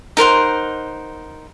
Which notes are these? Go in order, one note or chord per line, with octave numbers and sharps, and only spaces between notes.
D#4 A#4 C5 F#5